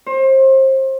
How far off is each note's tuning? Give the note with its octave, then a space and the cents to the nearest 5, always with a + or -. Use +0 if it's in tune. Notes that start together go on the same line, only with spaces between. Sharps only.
C5 +30